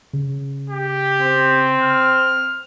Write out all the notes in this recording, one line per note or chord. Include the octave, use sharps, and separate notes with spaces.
C#3
G4
C4
F6